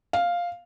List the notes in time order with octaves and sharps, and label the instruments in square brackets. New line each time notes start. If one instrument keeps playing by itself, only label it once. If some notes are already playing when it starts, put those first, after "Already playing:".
[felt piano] F5